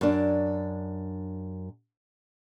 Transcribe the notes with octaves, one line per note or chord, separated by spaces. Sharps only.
F#2 D4